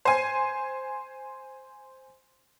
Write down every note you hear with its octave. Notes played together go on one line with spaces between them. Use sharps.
C5 G#5